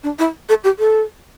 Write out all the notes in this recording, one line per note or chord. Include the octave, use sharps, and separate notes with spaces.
D4
E4
A4
G4
A4